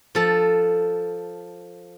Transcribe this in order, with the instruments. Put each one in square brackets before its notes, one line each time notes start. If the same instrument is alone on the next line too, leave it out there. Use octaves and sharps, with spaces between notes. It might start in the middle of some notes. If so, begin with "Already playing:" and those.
[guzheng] F3 A4